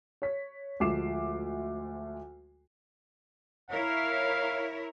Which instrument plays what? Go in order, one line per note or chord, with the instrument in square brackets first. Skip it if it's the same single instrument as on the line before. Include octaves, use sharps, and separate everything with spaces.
[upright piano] C#5 B6
D2 F3 G#3 D6 C7 E7
[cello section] E4 A#4 C#5 [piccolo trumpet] F5